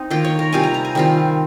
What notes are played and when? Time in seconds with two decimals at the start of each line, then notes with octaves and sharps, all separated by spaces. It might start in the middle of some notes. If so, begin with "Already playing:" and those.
Already playing: C4 D#4
0.10 D#3 A#3 F4 G5
0.25 C#5
0.39 A#4
0.53 C3 G3 C4 F4 G#5
0.64 A#5
0.74 A#5
0.85 G#5
0.95 D#3 G3 C4 F4